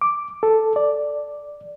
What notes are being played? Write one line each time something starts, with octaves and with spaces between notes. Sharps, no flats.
D6
A4
D5